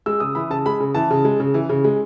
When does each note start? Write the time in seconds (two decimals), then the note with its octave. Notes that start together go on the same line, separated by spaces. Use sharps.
0.06 G#3 E6
0.20 C#3 D#6
0.35 E3 B5
0.50 C#3 A5
0.66 G#3 B5
0.80 C#3
0.95 E3 A5
1.10 C#3
1.25 G#3
1.40 C#3
1.54 E3
1.69 C#3
1.84 G#3